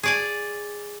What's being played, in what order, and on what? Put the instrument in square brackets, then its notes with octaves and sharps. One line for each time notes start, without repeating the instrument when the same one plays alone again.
[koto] G#4 D5 G#5